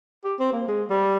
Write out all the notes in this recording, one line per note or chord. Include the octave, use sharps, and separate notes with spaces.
G4
C4
A#3
G#3
G3